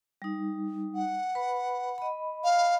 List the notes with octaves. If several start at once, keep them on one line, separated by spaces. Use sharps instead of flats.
G3 D#4
F#5
B4 B5
D#5 B5
F5